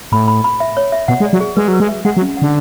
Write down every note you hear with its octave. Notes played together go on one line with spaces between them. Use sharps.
A2 B5
B5
B5
E5
C#5
E5
B2 F#5
G#3
D5
F#3
G#4
G#3 B4
F#3
B4
G#3
E5
G#3 F#5
F#3
C#4
D3 F#5